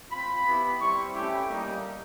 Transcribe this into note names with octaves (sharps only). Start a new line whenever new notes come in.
C4 F4 B5
B3 E4 G4
G3 C4 E4 C#6
A3 C#4 E4 G4
G3 A#3 D#4